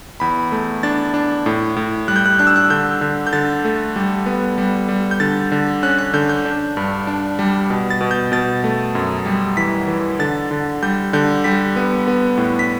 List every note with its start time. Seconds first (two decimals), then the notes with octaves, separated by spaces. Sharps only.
0.20 E2 B5
0.52 A3
0.83 D4 A6
1.14 D4
1.46 A2
1.76 A2
2.08 G3 F#6
2.16 G6
2.26 F#6
2.39 D4 F#6
2.47 E6
2.56 F#6
2.70 D3 G6
3.01 D3
3.27 G6
3.33 D3 A6
3.65 A3
3.96 G3
4.26 B3
4.58 G3
4.89 G3
5.11 G6
5.20 D3 A6
5.52 D3
5.83 C#4 F#6
5.98 F#6
6.13 D3 G6
6.29 G6
6.45 D4
6.77 G2
7.07 D4
7.39 G3
7.70 B2
7.91 A6
8.01 B2
8.11 G6
8.32 B2 A6
8.64 A3
8.95 F#2
9.26 G3
9.57 E3 B6
9.88 E3
10.19 D3 A6
10.51 D3
10.82 G3 G6
11.13 D3 G6
11.44 G3 B6
11.76 B3
12.07 B3
12.38 A2
12.59 B6